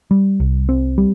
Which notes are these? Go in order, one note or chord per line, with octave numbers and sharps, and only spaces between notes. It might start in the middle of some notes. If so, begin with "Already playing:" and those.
G3
C2
C4
G3